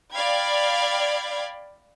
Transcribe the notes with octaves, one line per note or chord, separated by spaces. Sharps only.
D5 F5 G5 B5 G#6